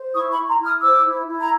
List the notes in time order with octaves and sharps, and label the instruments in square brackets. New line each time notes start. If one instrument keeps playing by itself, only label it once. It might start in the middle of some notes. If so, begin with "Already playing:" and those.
Already playing: [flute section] C5
E4 C#6 D#6
B5 C#6
E4
A#5 C6
E4
D#6 F6
C5 D6 E6
E4
E4
A#5